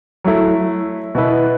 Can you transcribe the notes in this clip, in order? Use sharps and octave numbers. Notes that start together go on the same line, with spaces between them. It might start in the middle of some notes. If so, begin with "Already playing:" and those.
F#3 A3 E4
B2 B3 E4 B4